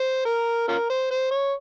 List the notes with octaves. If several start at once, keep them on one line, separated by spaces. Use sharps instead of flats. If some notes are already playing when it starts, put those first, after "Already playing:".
Already playing: C5
A#4
C#4 F4 A#4
C5
C5
C#5